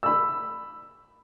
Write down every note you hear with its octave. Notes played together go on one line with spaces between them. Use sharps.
B5 E6